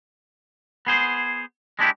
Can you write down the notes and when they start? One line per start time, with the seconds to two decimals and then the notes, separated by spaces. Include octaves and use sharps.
0.87 B3 G#4 C5
1.79 G#3 D4 E4 G4